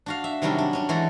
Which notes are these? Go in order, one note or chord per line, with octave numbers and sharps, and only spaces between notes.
D4 F#4 F5
E5
C3 D#3 F#3 G3 C#4 D4
D4
C#4 D4
E3 G#3 F#4 A4